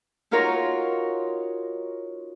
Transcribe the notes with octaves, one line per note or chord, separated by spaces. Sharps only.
D#4 F4 F#4 A#4 C#5 C6